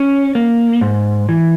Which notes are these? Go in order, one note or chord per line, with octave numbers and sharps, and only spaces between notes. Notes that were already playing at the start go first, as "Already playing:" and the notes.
Already playing: C#4
A#3
G#2
E3